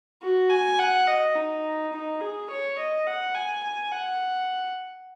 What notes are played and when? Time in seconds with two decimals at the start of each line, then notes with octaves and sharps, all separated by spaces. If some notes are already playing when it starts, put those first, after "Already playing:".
0.22 F#4
0.50 G#5
0.79 F#5
1.07 D#5
1.36 D#4
1.92 D#4
2.21 G#4
2.50 C#5
2.78 D#5
3.07 F#5
3.35 G#5
3.64 G#5
3.92 F#5